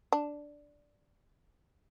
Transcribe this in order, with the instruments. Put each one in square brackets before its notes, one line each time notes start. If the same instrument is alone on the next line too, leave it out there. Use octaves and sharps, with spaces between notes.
[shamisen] D4